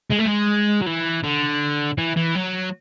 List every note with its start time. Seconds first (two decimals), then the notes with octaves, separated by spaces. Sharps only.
0.12 G#3
0.20 A3
0.27 G#3
0.82 F#3
0.86 E3
1.24 D3
1.98 E3
2.16 E3
2.35 F#3